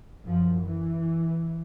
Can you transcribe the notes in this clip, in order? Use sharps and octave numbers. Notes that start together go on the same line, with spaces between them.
F#2 F3
E3